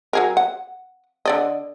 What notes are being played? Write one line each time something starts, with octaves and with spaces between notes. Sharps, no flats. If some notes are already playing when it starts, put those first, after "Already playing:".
F#3 G#4 A#4
F#5
D3 D5 D#5